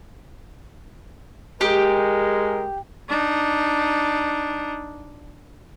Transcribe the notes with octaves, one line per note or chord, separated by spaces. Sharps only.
G#3 G4 A#4 G5
D4 D#4